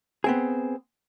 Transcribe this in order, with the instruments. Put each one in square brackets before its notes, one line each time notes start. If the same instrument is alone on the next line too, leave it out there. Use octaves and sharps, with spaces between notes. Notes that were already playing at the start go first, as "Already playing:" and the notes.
[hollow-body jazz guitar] B3 C4 G#4